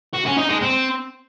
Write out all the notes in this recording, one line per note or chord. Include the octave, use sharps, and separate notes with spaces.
F#4
C#4
D#4
G#3
C4